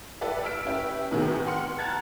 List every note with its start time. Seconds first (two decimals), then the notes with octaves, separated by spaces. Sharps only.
0.21 E4 G4 A4 B4 D5 E5
0.44 E6 F6 B6 D7
0.65 C#4 E4 G4 B4
1.11 A2 C3 D#3 B3 F#4 G#4
1.46 F#5 G5 C6 F6 C#7
1.79 A5 A#5 F#6 G#6 A6